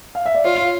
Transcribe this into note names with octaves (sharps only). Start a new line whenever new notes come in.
F5
E5
D5
F4 C#5